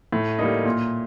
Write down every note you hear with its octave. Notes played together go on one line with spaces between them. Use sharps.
A2
G3 A#3 D#4
A#2